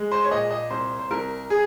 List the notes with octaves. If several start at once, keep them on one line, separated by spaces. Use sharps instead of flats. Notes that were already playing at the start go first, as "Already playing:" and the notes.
Already playing: G#3
C5
C#5
A#2 D#5
D#5
C2 C5
C5
C2 A#4
G#4